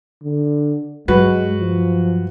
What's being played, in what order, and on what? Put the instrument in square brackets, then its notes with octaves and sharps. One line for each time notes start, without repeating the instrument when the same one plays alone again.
[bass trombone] D3
[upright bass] G2 F#3 [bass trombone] G#3 [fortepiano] F#4 B4
[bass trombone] F3